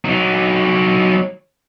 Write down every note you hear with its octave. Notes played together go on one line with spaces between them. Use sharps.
F#3 D#4